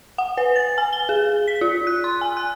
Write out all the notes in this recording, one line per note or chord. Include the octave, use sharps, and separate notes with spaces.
F#5
B4
A6
G#5
G7
G#4
B6
F4
F#6
C6
G#5
F#6